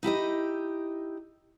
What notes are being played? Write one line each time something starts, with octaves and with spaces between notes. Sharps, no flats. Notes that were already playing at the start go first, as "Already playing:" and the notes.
D#4 E4 G4 D#5